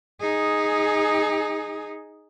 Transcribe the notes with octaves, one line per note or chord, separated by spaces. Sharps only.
D#4 G#4